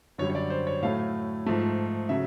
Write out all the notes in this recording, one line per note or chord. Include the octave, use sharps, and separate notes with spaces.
F#2 D3 G3 C#5
C#5
D5
C5
C#5
A2 F#3 A3 F5
G#2 F3 A3
C#3 F#3 E5